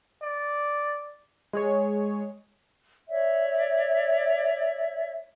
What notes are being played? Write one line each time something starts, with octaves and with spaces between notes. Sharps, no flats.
D5
G#3 G#4 C#5
C#5 D5 E5